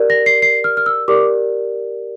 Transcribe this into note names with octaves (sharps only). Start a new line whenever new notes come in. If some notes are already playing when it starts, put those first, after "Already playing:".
Already playing: G4 A#4 D5
A#6
C7
C7
F6
F6
E6
G4 A#4 D5 D6